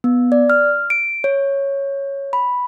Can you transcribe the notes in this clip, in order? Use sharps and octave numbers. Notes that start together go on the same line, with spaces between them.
B3
D5
F6
D7
C#5
B5